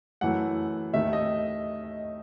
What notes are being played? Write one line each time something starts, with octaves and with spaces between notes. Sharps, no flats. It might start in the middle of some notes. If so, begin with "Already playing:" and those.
F#2 E3 A3 F#5
D#2 D#3 A3 E5
D#5